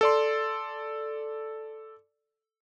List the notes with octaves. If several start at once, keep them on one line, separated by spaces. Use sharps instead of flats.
A4 D5 C6